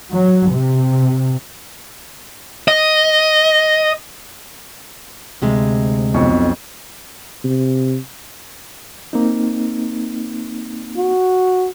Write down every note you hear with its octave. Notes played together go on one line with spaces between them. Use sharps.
F#3
C3
D#5
D2 C3 G#3
B1 F2 C#6
C3
A#3 C4 D#4
F#4